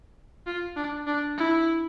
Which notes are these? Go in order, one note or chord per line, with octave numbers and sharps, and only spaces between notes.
F4
D4
D4
E4